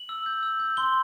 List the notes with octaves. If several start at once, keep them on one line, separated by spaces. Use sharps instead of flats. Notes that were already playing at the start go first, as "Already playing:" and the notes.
Already playing: F#7
E6
G6
E6
G6
C6 G7